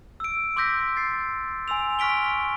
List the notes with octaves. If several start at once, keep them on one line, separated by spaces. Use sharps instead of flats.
E6 D7
C6 D6 E6 G6 A#6 B6
A6 C7
G#5 C6 E6 F7
C#6 F6 B6 D7 G7